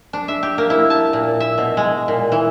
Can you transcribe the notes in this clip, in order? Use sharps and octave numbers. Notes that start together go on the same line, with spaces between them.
D4
E5
G4
A#3
E4
A5
A#2
E5
B2
G#3
A#2
E3